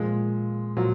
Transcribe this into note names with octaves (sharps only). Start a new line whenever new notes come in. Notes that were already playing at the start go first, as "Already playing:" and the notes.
Already playing: A#2 F3 G#3
A#2 F3 F#3